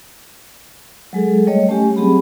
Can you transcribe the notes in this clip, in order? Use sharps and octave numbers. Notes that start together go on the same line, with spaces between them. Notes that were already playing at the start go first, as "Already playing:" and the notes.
F#3 G#3 G#4 A4
G3 A3 C#5 D#5
A3 C#4 G4 G#5
F#3 C4 G4 G#4 B5